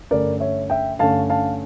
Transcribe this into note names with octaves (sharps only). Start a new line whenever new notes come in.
G2 D3 A3 C#4 A#4 D5
C#5 E5
E5 G5
G2 D3 A3 C#4 F5 A5
F5 A5